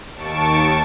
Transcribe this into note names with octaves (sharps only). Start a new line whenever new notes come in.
D#2 A5 C#6 D7